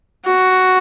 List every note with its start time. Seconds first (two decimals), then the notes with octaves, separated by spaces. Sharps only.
0.25 F#4